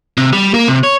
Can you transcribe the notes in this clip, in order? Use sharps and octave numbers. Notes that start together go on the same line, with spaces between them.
C3
G3
A#3
C3
C#5